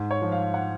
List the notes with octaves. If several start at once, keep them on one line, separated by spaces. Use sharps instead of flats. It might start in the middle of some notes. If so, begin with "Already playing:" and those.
Already playing: G#2
C#5
F3
F5
F#5